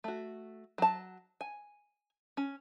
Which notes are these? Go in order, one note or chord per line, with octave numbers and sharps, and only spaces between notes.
A3 F#4
F#3 A5
G#5
C#4